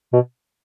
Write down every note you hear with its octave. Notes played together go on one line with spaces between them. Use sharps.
B2